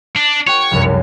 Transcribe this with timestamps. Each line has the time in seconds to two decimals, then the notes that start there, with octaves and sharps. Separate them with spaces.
0.16 D4
0.47 F#4 C#5 G5
0.71 F1 C2 F#2